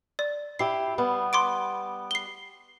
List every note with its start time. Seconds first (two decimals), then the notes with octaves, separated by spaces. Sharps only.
0.19 D5
0.59 E4 G4 E5 C7
0.98 G3 B3
1.33 C6 D6 D7
2.11 C7 G7